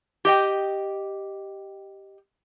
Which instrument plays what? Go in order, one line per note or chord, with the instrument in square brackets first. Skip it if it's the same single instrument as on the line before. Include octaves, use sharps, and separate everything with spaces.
[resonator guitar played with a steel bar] G4 D#5 G5